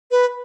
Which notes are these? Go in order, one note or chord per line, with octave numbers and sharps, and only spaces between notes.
B4